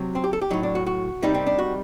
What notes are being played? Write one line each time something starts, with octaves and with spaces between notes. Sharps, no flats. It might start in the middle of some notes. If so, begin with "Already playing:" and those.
Already playing: C3 F#3
C4
G4
A4
G4
A2 F#3 D#4
D4
F#4
F#4
C3 D#3 G3 D#4
C4
D4
F#4